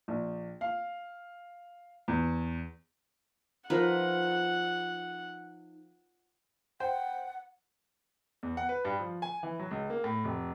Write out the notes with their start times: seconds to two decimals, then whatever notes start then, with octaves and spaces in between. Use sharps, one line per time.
0.08 A#1
0.61 F5
2.08 E2
3.70 F3 D#4 A#4 B4 F#5
6.80 C5 F#5 G5
8.43 E2
8.57 F#5
8.69 B4
8.85 G2
8.99 F3
9.22 G#5
9.43 E3
9.59 F#3
9.71 C#2
9.90 A#3
10.04 A2
10.24 F1